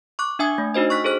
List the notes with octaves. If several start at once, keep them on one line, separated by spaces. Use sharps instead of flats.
C#6 D6 F#6
D4 E5 G#5 D#6 G#6
A3
D4 D#4 F#4 C5 D#5
C#6 F6 F#6 B6
G#4 A4 C5 F#6